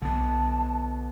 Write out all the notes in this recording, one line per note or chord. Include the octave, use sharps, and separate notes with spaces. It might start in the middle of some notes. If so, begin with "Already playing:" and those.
B1 D3 B3 A5